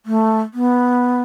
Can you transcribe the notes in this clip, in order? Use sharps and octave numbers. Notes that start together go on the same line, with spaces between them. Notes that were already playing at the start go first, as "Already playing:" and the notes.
A3
B3